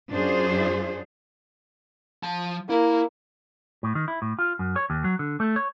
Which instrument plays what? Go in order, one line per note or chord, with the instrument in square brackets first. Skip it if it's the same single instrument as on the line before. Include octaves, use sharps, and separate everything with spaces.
[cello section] F#2 C#4 D4 F4 G#4 C5
[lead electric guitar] F3 A5
[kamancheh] A#3 [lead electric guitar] E4
[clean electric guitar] A2
D#3
E4
A2
F4
F#2
C#5
D#2
F#3
D3
A3
C#5